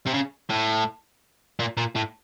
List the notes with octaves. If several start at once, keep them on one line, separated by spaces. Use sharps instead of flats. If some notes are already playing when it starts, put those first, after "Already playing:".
C3
C#3
A2
A#2
A#2
A2